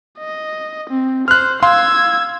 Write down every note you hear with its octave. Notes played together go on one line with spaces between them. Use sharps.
D#5
C4
C5 F6 F#6
F5 C6 E6 G#6